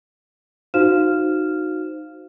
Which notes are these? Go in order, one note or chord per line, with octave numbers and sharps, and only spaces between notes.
D#4 F#4 C5 F5 F6 E7